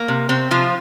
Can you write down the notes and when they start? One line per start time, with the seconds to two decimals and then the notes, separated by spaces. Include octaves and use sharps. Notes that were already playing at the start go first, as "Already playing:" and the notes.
Already playing: A#3
0.08 C3
0.29 C3 C4
0.51 C3 F3 F4